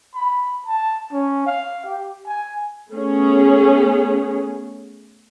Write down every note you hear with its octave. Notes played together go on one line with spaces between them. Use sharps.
B5
A5
C#4
F5
G4
G#5
A3 B3 C#4 G#4